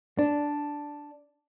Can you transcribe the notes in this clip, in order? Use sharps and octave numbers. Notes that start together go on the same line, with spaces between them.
D4